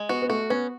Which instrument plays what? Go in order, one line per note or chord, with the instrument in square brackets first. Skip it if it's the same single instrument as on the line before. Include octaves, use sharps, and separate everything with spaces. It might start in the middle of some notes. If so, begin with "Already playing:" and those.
Already playing: [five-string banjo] G#3
[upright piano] B3 [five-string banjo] F#4
[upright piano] B3
[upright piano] A3 [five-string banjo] F#4
[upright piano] B3 [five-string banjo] C#4